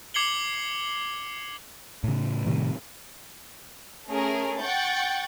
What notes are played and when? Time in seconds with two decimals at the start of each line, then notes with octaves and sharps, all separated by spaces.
0.14 D6 G#6 C7 C#7 F#7 G7
2.04 A2 C#3
2.46 A2 C3 D#3 G3
4.09 A3 C#4 G#4 A#4
4.60 F#5 G5 C#6 G6 A6